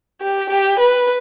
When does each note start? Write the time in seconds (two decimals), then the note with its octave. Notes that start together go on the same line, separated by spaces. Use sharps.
0.21 G4
0.50 G4
0.79 B4